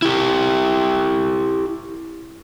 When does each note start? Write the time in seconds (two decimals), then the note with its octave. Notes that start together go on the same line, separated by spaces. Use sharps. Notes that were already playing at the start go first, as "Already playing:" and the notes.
0.02 E4 G4